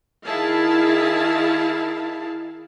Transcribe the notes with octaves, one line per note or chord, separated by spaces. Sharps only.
D#3 E4 G#4 F5 A5